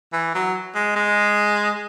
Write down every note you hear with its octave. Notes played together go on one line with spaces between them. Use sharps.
E3
F#3
G#3
G#3